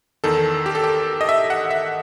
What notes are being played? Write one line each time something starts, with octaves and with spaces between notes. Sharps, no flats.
E2 D#3 A4
G4
A4
G4
D#5
E5
F#5
E5